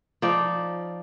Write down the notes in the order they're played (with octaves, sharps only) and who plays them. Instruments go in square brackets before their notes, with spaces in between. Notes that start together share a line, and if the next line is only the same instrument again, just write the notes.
[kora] F3 D#4 D5